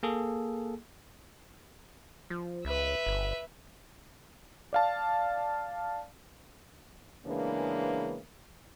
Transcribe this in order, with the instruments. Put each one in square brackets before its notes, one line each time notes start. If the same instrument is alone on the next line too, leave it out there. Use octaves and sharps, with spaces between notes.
[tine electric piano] A#3 G#4 A4
[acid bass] F3
[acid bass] C#2 [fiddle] B4 E5
[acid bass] G1
[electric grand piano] D5 F5 A5
[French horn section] C#3 E3 G#3 A#3 B3 D4